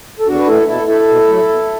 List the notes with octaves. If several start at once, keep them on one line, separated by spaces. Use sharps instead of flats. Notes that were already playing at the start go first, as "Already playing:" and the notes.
A4
E2 D4 F#4
B4
E3 A3 E4 A4
B2 E4 A4
A3 E4 A4
B2
F#3 A3
B2